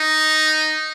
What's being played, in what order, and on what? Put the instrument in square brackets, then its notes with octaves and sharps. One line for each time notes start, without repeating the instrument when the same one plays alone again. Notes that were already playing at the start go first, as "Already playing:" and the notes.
Already playing: [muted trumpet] D#4